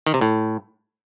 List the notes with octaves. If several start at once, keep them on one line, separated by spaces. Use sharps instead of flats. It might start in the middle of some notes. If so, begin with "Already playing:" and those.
D#3
C3
A2